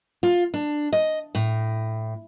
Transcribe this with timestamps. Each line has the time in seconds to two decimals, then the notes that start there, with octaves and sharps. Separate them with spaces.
0.23 F4
0.54 D4
0.93 D#5
1.35 A2